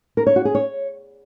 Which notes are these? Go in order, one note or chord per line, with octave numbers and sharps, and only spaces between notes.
A#4
C#5
F#4
G#4
C#5